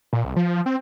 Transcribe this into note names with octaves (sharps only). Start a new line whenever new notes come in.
A#2
C2
F3
C4